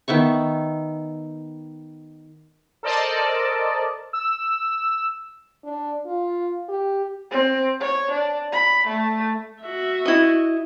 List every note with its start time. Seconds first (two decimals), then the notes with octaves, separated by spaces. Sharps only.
0.08 D#3 B3 E5 C#6
2.83 A4 A#4 C5 D5 D#5 A5
4.13 E6
5.64 D4
6.06 F4
6.69 G4
7.31 C4
7.80 C#5
8.11 D4
8.52 B5
8.87 A3
9.62 F#4 E5
10.06 E4 D#5